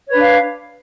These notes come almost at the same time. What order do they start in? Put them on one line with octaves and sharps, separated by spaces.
C#5 B4 D4 F5